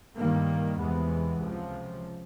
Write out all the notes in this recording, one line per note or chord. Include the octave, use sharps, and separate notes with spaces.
G2 D#3 G3 A#3
E2 C3 E3 G#3 B3
C#2 C3 F3